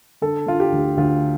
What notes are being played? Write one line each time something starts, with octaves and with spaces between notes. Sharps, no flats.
D3 A4
D3 F4
G4
D2
D2 F4